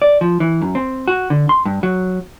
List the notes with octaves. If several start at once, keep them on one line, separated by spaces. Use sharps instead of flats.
D5
F3
E3
F#2
C4
F#4
D3
C6
G2
F#3